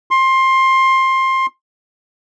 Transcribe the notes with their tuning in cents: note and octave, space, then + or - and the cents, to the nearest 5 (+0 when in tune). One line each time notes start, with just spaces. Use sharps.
C6 +20